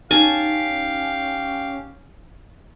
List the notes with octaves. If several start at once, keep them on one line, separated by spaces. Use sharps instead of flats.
C#4 D#4 G4 F5 G#5 A5